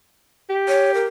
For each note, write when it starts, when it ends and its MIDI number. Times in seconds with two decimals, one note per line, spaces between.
0.50 1.06 67
0.68 0.94 73
0.94 1.08 70